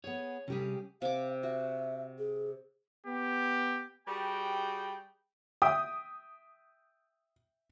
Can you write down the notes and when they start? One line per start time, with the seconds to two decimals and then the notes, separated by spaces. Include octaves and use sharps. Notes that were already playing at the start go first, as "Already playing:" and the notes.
0.04 B3 G#4 C#5
0.48 C3 G3 C#4 G4 G#4
1.02 C3 F5 D6
1.43 F#4 E5
2.19 G#4
3.07 B3 G4
4.07 G3 F#4 G#4 B4 G5
5.62 E5 G5 D#6